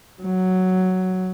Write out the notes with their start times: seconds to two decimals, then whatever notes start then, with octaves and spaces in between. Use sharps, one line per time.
0.22 F#3